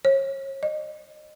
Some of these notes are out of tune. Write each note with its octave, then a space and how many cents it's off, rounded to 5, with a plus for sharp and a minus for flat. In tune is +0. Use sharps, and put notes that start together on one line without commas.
C#5 -30
D#5 -30